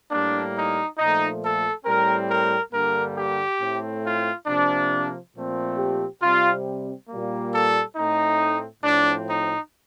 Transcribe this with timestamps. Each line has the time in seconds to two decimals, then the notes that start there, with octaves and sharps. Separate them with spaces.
0.11 A2 G3 A#3 D4
0.55 D#4
0.98 A#2 F3 A3 D#4
1.42 A4
1.85 A2 G3 C4 A#4
2.30 A#4
2.73 G2 D3 G3 A#3 A#4
3.16 G4
3.60 A2 A3 C4
4.04 F4
4.47 C3 F3 A#3 D4
5.35 A#2 F3 A3 C4
5.78 G4
6.22 C3 G3 C4 F4
7.09 A#2 G3 A#3
7.53 A4
7.96 A2 A3 C4 D#4
8.84 A2 F3 C4 D4
9.28 D#4